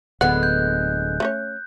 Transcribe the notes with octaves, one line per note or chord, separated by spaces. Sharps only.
D1 D3 G#3 B3 F#5 F#6
G6
A3 C#4 C#5